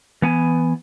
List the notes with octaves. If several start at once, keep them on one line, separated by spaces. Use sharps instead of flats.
E3 B3 G#5